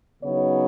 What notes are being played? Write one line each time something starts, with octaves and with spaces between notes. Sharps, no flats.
C#3 F#3 B3 D#4 C#5